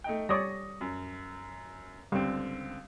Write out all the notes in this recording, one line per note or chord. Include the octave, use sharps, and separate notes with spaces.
A3 D#4 G5
G3 C#5 D5 C#6 D#6 A#6
F#2
C#2 D3 G3 C4